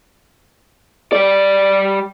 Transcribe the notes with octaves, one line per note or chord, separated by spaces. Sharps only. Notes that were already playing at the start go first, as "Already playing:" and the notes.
G3 D5